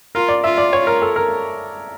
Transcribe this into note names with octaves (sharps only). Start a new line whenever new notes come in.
F4 A#4
D5
F4 E5
D5
C#5
A#4
A4
A#4